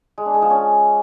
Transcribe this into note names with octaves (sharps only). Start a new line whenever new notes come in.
G#3
D4
G#3
F3
C#4